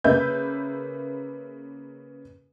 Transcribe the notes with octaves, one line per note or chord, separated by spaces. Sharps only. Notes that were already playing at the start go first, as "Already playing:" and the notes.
C#3 A#3 B4 E5 G6